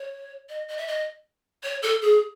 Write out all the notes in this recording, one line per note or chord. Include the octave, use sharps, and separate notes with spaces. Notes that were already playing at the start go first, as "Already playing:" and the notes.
Already playing: C#5
D#5
D#5
E5
D#5
C#5
A4
G#4